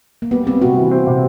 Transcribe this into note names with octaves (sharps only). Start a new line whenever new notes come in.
A#3
G3 B3
G3 C4
C3 F#4
E3
C4
C3